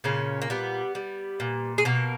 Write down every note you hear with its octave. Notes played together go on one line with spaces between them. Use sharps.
A#2 C#3 C#4
A#3
G3 B3
G3
A#2
G#4
B2 A#3 A#4